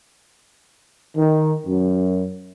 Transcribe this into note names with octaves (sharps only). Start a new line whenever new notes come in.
D#3
F#2